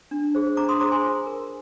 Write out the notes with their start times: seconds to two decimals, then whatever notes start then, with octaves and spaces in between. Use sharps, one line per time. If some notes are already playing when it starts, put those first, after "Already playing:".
0.11 D4
0.35 G#4 C5
0.57 D4 A#5 D6
0.69 C6 D#6
0.80 G#4 C5 A#5 D6
0.92 G#5 C6
1.04 F4
1.27 A#4